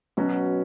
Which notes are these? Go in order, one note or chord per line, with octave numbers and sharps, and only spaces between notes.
B2 F#3 C#4 F#4